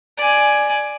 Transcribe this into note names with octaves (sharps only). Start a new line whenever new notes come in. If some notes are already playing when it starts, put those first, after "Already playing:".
D5 G#5